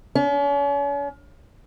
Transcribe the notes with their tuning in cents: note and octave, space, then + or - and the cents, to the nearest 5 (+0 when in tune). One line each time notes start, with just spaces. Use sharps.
C#4 +40